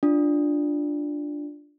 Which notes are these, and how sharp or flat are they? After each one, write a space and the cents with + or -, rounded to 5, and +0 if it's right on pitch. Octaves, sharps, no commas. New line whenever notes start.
D4 +0 F4 +0